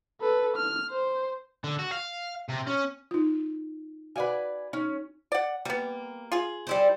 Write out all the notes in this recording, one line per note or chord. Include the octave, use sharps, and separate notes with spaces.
A4 B4
F6
C5
D3
F#4
F5
C3
C#4
D#4 F4
F#4 B4 D5 F5 F#5 G#5
C#4 D#4
D5 F#5
G3 A#3 B3
F4 G#4
G3 E4 C5